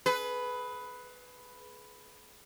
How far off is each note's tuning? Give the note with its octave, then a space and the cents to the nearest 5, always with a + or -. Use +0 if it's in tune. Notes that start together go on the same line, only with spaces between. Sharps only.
G#4 +35 B4 +5